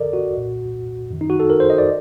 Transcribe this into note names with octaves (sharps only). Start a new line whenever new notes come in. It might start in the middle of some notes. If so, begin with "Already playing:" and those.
Already playing: G2 D3 A4 A#4 D5 D#5
F#4
C2 A#2
F#2 D#3
D#4
F#4
A4
A#4
C5
D#5
D5